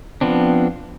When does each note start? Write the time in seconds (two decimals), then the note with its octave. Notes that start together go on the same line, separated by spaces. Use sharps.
0.21 F3 B3 C4 D4